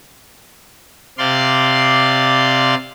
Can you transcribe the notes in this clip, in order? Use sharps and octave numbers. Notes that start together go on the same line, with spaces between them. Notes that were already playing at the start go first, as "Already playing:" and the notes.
C3 D5 F5 C6